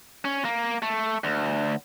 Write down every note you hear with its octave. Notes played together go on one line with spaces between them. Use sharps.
C#4
A#3
A3
D2